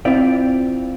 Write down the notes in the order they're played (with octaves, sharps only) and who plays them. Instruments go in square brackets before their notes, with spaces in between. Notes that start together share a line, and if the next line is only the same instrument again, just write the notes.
[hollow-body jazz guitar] C4 E4 F4 D5